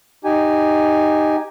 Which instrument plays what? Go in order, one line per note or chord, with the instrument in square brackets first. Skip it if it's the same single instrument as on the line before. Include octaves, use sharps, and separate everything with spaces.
[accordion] D#4 G4 G#5